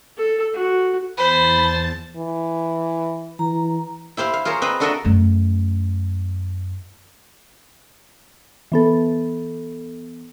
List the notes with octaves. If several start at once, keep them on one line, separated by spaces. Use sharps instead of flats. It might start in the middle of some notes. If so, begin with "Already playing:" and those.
A4
F#4
E2 C5 A5 B5 A6
E3
E3 A#5
E4 G4 C5 F5
F5
F4 G#4 A#4 C5 C#5
C4 B4 D#5 A#5 B5
D4 F#4 A4 A#4 D#5 E5
F#2 A3
E3 B3 A4